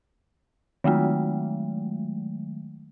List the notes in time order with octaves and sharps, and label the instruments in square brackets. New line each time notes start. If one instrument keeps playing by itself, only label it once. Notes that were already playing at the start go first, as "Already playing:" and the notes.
[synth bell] D#3 F#3 G#3 A3